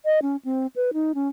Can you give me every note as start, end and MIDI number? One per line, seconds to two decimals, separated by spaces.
0.05 0.19 75
0.22 0.36 61
0.45 0.67 60
0.76 0.91 71
0.94 1.12 63
1.15 1.28 61